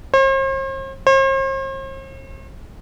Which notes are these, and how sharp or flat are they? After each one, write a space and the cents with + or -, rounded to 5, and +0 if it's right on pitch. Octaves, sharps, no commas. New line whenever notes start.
C5 +45
C5 +45